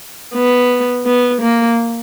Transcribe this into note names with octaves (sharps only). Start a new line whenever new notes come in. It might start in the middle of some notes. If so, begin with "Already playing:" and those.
B3
B3
A#3